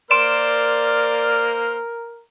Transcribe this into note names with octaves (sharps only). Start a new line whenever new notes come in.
A#3 A#4 C5 D5 C6 F6 D7 E7